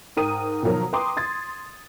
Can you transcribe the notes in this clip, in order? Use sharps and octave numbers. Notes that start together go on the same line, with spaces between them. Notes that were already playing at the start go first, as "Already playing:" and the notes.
G#2 A#4 G5 D#6 D#7
B2 D#3 F3 F#3 A#4
B4 G5 A#5 C6 D6 D#6
C6 G#6 A6